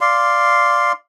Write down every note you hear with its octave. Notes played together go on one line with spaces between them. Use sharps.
D5 F5 C6